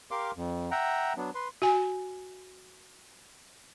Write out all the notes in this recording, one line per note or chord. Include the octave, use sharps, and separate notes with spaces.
G4 A#4 F5 C6 D6
F2
E5 F#5 G5 A#5
F#3 B3 D4
B4 C6
F#4 G#5